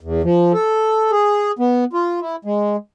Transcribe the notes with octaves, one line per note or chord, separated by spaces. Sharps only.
E2
F3
A4
G#4
B3
F4
E4
G#3